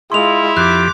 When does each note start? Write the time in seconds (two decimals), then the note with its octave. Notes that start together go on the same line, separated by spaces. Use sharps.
0.12 G#3 E4 F4 C6 F7
0.57 F2 G4 D6 F#6